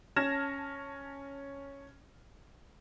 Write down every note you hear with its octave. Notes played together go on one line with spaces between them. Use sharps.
C#4 A5 F6 G#6 A#6 E7